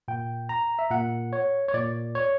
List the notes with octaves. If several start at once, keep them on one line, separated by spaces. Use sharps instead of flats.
A#2 G5
A#5
E5
A#2 F#5
C#5
C#5
A#2 D5
C#5